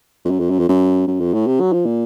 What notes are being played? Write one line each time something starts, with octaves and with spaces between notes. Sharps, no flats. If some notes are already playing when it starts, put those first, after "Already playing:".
F2
F#2
F2
F#2
F2
F#2
F#2
F2
A2
C3
F#3
F3
A#2